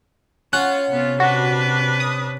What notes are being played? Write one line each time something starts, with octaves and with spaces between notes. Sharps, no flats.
C#4 F4 F#5
C3 B3 F4
D4 F#4 B4
D#6